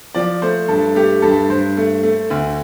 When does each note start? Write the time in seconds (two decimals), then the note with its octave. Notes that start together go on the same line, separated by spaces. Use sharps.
0.15 F3 D5
0.42 A3 C5
0.68 G2 A4
0.95 A3 G4
1.22 G2 A4
1.50 G2 C5
1.77 A3
2.03 A3
2.30 D2